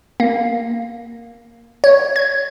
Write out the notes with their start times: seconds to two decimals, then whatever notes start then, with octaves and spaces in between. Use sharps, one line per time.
0.20 A#3
1.84 C#5
2.16 G#6